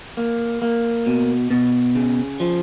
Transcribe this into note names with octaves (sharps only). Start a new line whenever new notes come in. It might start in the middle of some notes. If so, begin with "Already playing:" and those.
A#3
A#3
B2
B2
C#3
F3